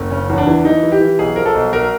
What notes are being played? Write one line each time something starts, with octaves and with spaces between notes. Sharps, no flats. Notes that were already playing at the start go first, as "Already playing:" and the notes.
Already playing: F#1
C#3 C#4
E2 C#4
D4
E3
E3 D#4
E3
G4
E3
B1 G#4
F3 A#4
A4
B1
B1 A#4